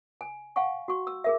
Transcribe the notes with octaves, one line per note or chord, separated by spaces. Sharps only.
G#5
F5 F#5 G#5 C#6
F#4 C#6
E6
G#4 A#4 E5